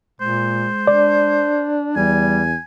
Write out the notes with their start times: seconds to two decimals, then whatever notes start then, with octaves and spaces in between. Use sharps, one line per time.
0.21 A#2 G#3 C5
0.87 D4 D5
1.96 E2 G3 G#5